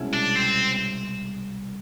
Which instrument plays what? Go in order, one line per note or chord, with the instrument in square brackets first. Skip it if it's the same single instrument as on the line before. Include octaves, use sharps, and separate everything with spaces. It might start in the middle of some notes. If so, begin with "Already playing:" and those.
Already playing: [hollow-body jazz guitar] C2 B2 G#3 C#4 E4
[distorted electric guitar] D4
C4